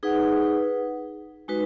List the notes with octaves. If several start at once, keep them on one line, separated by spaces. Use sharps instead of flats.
D#4 G#4 B4 F#5
G#3 D#4 F#4 B4